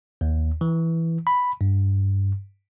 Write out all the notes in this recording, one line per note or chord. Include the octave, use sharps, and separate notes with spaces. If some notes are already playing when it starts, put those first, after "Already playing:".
D#2
E3
B5
G2